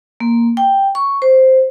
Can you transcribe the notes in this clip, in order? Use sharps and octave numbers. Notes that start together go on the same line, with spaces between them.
A#3
G5
C#6
C5